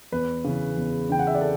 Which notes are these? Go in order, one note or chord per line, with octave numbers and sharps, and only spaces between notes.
E2 B4
C#3 E3
E2
C#3 E3 G5
F#5
E5
D5
A4